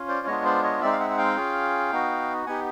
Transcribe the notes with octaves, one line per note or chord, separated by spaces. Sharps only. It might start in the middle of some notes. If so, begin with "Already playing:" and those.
Already playing: C#4 F4
C5 D5
G#3 B3 D4 F4 C#5 D#5
C5 D5
C#5 D#5
G#3 C4 D#4 D5 E5
F5
E5 F#5
F#5
F5 G5
C#4 F4 G#4
B3 D#4 F#4
B3 D#4 G4 F#5 G#5